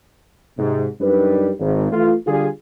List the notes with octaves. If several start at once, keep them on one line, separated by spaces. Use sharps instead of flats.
G#2 C3
F#2 G3 D4 D#4 B4
G#1
E3 A3 F4
D3 G3 F4 G#4